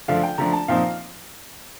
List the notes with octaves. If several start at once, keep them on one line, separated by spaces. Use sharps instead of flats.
D3 F3 A3 D4 F5
G5
D3 F3 A3 D4 A#5
A5
A#2 F3 C4 D#4 F5